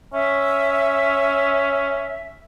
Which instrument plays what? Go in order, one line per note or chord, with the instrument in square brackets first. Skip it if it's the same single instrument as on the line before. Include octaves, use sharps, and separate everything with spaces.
[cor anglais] C#4 [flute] E5